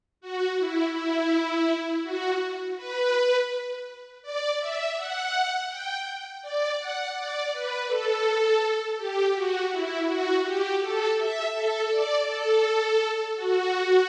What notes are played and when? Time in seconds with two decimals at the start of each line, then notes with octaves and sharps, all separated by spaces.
0.21 F#4
0.58 E4
0.94 E4
2.03 F#4
2.77 B4
4.22 D5
4.60 E5
4.96 F#5
5.69 G5
6.42 D5
6.78 F#5
7.16 D5
7.52 B4
7.88 A4
8.98 G4
9.34 F#4
9.71 E4
10.07 F#4
10.44 G4
10.80 A4
11.17 E5
11.54 A4
11.90 D5
12.27 A4
13.36 F#4